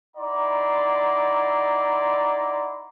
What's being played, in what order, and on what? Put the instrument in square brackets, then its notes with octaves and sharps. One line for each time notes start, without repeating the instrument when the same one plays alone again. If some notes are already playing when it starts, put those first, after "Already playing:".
[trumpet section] D#4 E4 D5 F#5 A#5 C6